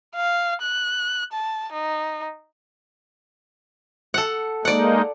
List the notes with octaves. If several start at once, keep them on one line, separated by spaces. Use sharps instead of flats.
F5
F#6
A5
D#4
A4 F#5
G#3 A#3 D#4 D5 F#5